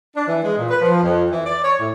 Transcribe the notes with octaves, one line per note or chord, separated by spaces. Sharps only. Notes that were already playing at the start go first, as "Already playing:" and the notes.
D4
E3
G#3
A#2
B4
F3
F2
E3
D5
C#5
A2